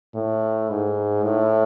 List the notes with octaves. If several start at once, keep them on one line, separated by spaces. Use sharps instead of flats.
A2
G#2
A2